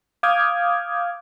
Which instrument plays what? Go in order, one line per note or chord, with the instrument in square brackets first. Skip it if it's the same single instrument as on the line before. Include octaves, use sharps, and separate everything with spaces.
[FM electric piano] F5 D6 D#6 F6 G6 G#6